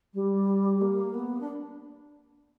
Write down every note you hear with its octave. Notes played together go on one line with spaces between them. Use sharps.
G3
A#3
B3
D4